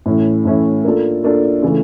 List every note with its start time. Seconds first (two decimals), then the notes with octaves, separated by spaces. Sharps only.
0.06 A2 E3 A3 C#4 E4
0.45 A2 E3 A3 C#4 E4
0.84 A#3 D4 F4 A4
1.24 A#3 D4 F4 A4
1.63 C#3 E3 A3